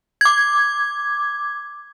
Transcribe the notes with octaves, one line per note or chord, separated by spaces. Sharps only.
D6 G#6